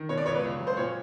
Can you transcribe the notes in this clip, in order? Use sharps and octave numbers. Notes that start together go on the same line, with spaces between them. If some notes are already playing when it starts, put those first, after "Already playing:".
Already playing: D#3
B2 C#5
D5
C#2 C#5
B4
C#2
F#3
C5
A#2 C#5